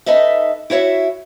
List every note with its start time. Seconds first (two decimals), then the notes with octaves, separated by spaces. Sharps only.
0.06 D#4 A4 B4 D#5 E5
0.70 E4 F#4 C#5 E5